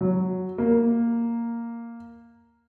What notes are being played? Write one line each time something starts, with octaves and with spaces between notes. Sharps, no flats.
F#3
A#3